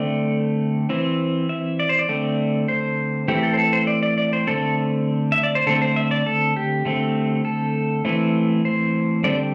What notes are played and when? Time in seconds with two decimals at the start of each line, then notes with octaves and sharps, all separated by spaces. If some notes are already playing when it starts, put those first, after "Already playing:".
Already playing: D3 A3 C4 D5
0.89 E3 C4
1.49 E5
1.80 D5
1.89 C5
1.99 D5
2.09 D3 A3 C4
2.68 C5
3.28 E3 A3 C4 G4
3.43 A4
3.54 C5
3.58 A4
3.73 C5
3.87 D5
4.03 D5
4.18 D5
4.33 C5
4.47 D3 A3 C4 A4
5.32 E5
5.43 D5
5.55 C5
5.66 D3 A3 C4 A4
5.82 C5
5.96 E5
6.11 D5
6.26 A4
6.56 G4
6.85 D3 A3 C4
7.45 A4
8.05 E3 A3 C4
8.65 C5
9.24 D3 G3 C4 D5